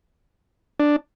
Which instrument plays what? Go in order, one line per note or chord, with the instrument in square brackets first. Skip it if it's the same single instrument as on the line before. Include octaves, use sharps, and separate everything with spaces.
[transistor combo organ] D4